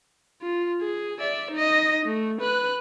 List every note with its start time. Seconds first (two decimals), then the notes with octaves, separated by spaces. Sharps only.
0.42 F4
0.82 G#4
1.19 D5 E5
1.51 D#4 D#5
2.05 A3
2.41 B4 F#6